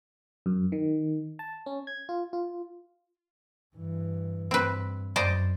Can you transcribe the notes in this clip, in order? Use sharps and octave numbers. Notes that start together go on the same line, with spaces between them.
F#2
D#3
A5
C#4
G#6
F4
F4
G2 E3
G2 C4 B4
F#2 C5 D5 D#5